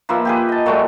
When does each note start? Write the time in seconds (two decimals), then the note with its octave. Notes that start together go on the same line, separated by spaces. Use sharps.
0.09 F3 A#3 B4 E5
0.25 G4 G#4 B4
0.49 D#5 A5
0.66 A#2 F#3 G#3 A3